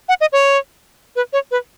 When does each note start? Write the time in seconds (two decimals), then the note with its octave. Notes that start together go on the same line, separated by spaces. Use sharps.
0.09 F#5
0.21 D#5
0.32 C#5
1.16 B4
1.33 C#5
1.51 B4